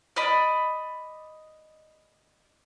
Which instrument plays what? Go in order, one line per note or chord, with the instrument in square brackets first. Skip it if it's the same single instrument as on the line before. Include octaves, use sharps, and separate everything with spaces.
[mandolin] D5 D#5 B5